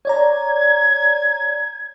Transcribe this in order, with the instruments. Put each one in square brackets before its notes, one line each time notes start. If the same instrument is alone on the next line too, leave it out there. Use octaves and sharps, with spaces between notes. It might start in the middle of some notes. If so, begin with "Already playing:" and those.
[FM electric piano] C#5 D5 A#5 [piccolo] G#6